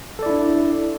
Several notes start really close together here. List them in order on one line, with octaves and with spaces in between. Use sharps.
A4 D5 E4 D4